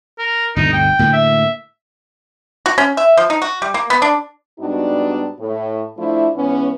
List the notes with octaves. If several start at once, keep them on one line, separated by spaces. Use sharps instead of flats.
A#4
G1 D2 B2 D#4
G5
A2 D3 A#3
E5
F#4
C#4
E5
F3
D#4
F#4
G3
A#3
B3
D4
G#2 G3 B3 D4 D#4 F#4
A2
F3 A3 D4 E4
G#2 E3 B3 C#4